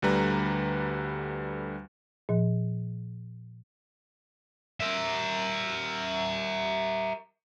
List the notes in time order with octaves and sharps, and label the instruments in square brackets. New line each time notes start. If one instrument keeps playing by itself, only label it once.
[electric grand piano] D2 D3 G3 B4 A#5
[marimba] A#2 F3
[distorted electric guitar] A#4 E5